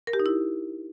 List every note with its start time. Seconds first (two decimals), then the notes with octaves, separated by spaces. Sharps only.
0.07 A#4
0.13 G4
0.20 D#4
0.26 E4